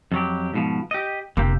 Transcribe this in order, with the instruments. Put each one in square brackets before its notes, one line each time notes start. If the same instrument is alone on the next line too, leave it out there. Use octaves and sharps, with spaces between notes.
[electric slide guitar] F2 F#3 G4
G#2 B2 F3
G4 D#5
[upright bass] F1 [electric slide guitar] D3 A#3 G4